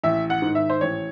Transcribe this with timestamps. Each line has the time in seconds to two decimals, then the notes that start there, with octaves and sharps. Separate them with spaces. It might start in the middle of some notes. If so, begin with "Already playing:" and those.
0.04 A1 E5
0.30 F#5
0.42 G#2 D#3
0.55 E5
0.70 C5
0.81 A1 C#5